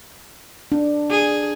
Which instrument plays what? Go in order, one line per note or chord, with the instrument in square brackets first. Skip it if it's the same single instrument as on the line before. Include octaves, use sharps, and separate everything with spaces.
[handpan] D4
[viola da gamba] G#4